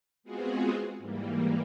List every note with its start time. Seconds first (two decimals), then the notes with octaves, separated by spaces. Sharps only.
0.23 G#3 B3 C4 F4 F#4 G#4
0.98 G#2 E3 G3 A#3